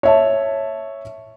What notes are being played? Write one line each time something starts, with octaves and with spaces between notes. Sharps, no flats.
C#5 E5 A5